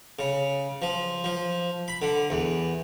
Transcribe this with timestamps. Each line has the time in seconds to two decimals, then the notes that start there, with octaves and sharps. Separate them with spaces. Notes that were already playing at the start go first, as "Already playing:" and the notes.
0.19 C#3
0.82 F3
1.24 F3
1.88 B5
2.02 D3
2.30 E2